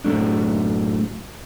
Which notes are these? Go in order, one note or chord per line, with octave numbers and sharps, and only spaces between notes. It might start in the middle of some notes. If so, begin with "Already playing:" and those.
F#2 A2 F#3 A3 D4